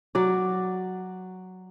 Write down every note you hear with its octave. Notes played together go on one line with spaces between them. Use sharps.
F#3 F#4 D5